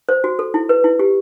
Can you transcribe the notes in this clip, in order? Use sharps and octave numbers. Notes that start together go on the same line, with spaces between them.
C5
F#4
A4
E4
B4
E4
G4